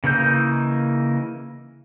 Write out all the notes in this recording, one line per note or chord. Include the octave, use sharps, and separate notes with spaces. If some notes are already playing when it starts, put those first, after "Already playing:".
C#3 E3 A#3 D#4 G6